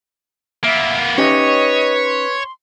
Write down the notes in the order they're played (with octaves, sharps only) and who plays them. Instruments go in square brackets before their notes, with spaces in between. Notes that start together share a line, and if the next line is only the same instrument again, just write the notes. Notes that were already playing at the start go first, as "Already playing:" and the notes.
[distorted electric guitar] A#3 B3 [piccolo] E5
[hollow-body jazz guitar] C#4 D#4 G4 [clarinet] B4 [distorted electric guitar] C#5 [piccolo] D#5
[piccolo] C6